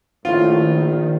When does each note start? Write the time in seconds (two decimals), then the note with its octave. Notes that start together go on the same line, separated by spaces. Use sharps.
0.25 A#1 A2 D#3 F4